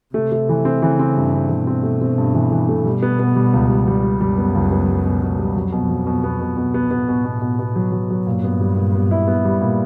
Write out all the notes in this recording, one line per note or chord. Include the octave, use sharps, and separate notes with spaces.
C3 A3
A3
E3
C4
C#3 E3
C4
G2
C4
B2 E3
C4
A3
C4
G2
E3
E3
A3
B2 G3
B3
B3
G3
C#2
G3
G3
G3
F#2 G3
B3
C#2
B3
G3
B2
B2
G3
F2 F#3
B2
F#3
B2
B3
B2
B2
B3
A2 B3
B2
B2
B2
B3
F#3
F#3
F#3
G2 A#2
B3
G3
A#2
B3
E4
B3
G3
A#2